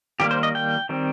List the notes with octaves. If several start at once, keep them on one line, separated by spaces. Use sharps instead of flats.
D#3 G3 A#3 G4
C5
D#5
G5
D#3 G3 C4